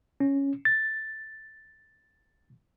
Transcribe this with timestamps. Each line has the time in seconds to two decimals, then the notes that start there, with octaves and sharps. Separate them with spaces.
0.20 C#4
0.65 A6